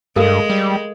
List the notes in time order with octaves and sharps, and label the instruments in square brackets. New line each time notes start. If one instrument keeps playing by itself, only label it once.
[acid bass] G2 [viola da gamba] G#3 [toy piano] A4 A#4 F5
[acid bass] G3